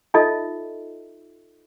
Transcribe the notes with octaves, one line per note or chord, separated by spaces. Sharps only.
D#4 F4 A4 D#5 E5